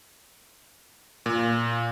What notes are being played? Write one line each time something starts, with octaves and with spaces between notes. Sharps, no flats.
A#2